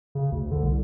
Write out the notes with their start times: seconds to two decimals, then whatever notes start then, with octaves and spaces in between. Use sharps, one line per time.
0.15 C#3
0.32 D2
0.51 D3
0.63 C2